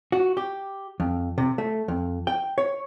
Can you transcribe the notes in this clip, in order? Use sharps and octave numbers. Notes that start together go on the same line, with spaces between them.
F#4
G4
F2
C3
A3
F2
G5
C#5